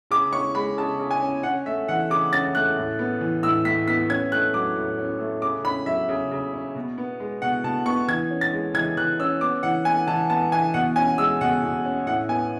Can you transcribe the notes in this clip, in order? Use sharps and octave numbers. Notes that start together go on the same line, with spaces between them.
C#3 D6
C#4 C#6
G#3 B5
C#3 A5
C#3
G#5
C#4
C#4 F#5
A3 E5
E3 F#5
C#3 D6
C#4 A6
A3 F#6
A2
B3
E3
A2 E6
A2 B6
B3 B6
C#4 G#6
A3 F#6
F#3 D6
A2
C#4
A3
C#3 D6
C#4 B5
F#3 E5
C#3
C#3
C#4
B2
B3
G#3
B2 F#5
B2 A5
B3 C#6
E3 G#6
C#4
A6
G#3
E3 G#6
E3 F#6
C#4 E6
B3 D6
E3 F#5
B3 G#5
E3 A5
B3 A5
E3 G#5
B2 F#5
C#4 G#5
G#3 E6
B2 F#5
B2
C#4
A2 F#5
B3 G#5